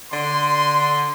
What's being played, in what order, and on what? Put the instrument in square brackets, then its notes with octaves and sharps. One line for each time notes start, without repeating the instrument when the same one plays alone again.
[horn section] D3 C6